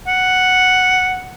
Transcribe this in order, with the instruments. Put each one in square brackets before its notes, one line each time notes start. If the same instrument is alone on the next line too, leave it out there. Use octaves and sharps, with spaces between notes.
[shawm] F#5